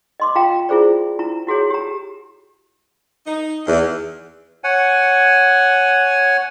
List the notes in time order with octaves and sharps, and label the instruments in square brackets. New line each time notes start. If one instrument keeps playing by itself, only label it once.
[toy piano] D#5 C6 D6
F4 F5 G5 A#5
E4 F4 G#4 C5 D5
E4 A#5
E4 F#4 G#4 C#5
G4 A#5
[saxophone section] D#4
E2
[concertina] C#5 F#5 G#5